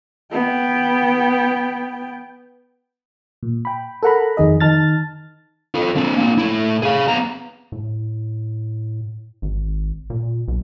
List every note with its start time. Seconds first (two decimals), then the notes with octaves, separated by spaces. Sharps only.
0.32 B3 G5
3.43 A#2
3.65 G5 B5
4.03 A4 A#4 F#5 A#5 B5
4.37 F2 D#3 G#4 D#5
4.60 D#3 D#4 A5 F6 A6
5.75 F4 A4
5.96 C4 D4
6.17 A#3 D4
6.38 A2 E4
6.82 G#4 F5
7.08 B3 A#5
7.72 A2
9.42 G#1
10.10 A#2
10.48 B1